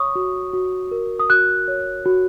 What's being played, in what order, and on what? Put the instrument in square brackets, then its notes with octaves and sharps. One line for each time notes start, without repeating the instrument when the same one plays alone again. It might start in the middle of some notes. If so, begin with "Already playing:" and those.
Already playing: [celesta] C#5 C#6 D#6
F#4
F#4
A#4
D#6
F#4 F#6
C#5
F#4